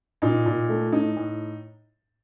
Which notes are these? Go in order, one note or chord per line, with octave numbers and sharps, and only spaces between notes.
A#2 D#4
A#2
A3
A2 D#4
A2